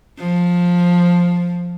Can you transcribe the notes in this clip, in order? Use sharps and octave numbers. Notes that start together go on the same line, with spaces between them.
F3